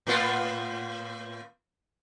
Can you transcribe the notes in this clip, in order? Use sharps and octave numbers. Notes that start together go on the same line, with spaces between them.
A2 B3 F4